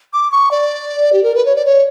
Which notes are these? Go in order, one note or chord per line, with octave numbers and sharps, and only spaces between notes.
D6
C#6
D5
G4
A#4
B4
C#5
D5
C#5